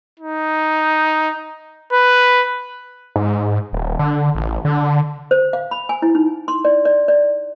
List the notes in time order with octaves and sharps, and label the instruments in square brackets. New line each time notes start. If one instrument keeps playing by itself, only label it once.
[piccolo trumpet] D#4
B4
[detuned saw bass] G#2
D#1
D3
A1
D3
[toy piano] C5
F5
B5
G#5
E4
D#4
C6
D5
D5
D5